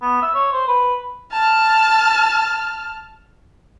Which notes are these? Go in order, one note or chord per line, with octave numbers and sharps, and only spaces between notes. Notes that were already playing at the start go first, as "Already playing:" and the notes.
B3
E5
C#5
C5
B4
A5 F6